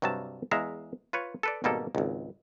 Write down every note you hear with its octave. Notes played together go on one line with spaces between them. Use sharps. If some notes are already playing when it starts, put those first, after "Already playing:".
G2 C3 F#3 G3 A5
E2 G#3 E5 F5 A#5
F4 B4 C#5
A4 B4 D5
G#1 B2 G3 A#3 G4 A4
G#1 C#2